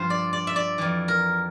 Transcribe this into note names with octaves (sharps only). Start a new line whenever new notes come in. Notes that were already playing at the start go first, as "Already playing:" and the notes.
Already playing: G2 F3 C5
D5
D5
E5
D5
F2 E3
A#4